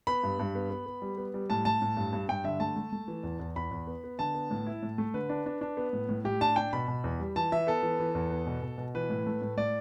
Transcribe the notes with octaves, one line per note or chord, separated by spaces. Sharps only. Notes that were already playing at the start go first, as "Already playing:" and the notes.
B3 B5
G2
G2
B3
B3
B3
G3
B3
G3
A2 A5
A2 A5
A2
G2
G2
G2 G5
D3 E5
A3 A5
A3
A3
E3
E2
E2
E2 B5
E2
B3
B3
D3 A5
B3
A2
E4
A2
A3
D3 B4
D4
D4
D4
B3
A2
A2
A2 G4
D4 A5
D4 G5
B2 B5
B2
E2
G3
E3 A5
E3 E5
B3 A4
E3
E3
E2
B3
B2
B2
B2
E3 B4
A2
A3
A2
A2 D5